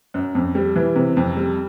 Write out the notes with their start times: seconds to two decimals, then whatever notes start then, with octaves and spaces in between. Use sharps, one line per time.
0.14 F#2
0.35 F2
0.55 G3
0.76 E3
0.96 C3
1.17 F2
1.37 G3